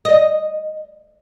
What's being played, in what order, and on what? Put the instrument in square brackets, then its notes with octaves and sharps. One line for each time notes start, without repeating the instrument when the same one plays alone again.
[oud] D#5